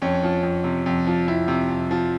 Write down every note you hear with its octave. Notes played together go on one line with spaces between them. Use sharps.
F2 C#4
F3
F2
C3
F2
F3
F2 E4
C3
F2
F3